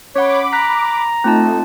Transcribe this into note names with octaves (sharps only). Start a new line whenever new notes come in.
C#4 C#5 F#5 B5 D6
A#5 F#6 B6
A3 C4 D#4 F4 A5